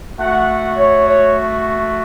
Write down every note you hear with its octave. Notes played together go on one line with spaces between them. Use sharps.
A3 F#4 F#5
C#5
C#5